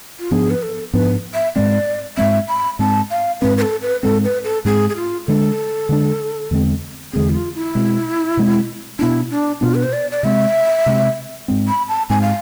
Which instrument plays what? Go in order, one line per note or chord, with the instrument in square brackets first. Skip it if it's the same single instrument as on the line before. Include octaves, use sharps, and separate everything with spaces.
[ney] F4
[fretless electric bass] G#2 F3 B3 D4 [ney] G#4
[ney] B4
A4
[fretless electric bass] G#2 F3 B3 D4 [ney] B4
[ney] E5
[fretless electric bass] G#2 G#3 C4 [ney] D5
[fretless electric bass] G#2 G#3 C4 [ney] E5
[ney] B5
[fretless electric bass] G#2 G#3 C4 [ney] A5
[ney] F5
[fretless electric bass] G#2 G#3 C4 [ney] B4
[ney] B4
A4
B4
[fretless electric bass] G#2 G#3 C4 [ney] A4
[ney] B4
A4
[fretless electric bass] G#2 G#3 C4 [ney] G#4
[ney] G#4
F4
[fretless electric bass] D3 G#3 D4 [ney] A4
[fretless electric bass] D3 G#3 D4
E2 D3 G#3 C4
[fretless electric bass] E2 D3 G#3 C4 [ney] G#4
[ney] E4
F4
E4
[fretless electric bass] B2 G#3 C4
B2 G#3 C4
[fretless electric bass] B2 B3 D4 [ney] E4
[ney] D4
[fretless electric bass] B2 B3 D4 [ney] F4
[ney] B4
C5
D5
D5
[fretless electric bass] C3 G#3 C4 [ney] E5
[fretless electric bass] C3 G#3 C4
G#2 G#3 C4
[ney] B5
A5
[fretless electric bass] G#2 G#3 C4 [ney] G#5
[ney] F5